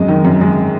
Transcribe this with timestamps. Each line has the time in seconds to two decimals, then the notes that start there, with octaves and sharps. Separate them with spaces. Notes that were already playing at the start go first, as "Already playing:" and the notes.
Already playing: F#2 G#3 D#5
0.08 D#3
0.25 F#2
0.41 G#3